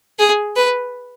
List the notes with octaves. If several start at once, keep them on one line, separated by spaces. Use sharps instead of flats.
G#4
B4